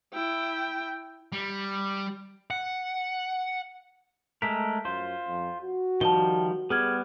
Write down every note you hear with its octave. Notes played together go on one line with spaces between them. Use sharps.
E4 G5
G3
F#5
G#3 A3 A#4 B6
F#2 F4 C5
F2
F#4
D#3 F3 G3 A5 G7
G3 B3 G#4 F6 G#6